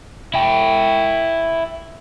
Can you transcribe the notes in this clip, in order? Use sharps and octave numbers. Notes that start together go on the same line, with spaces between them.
E4 G5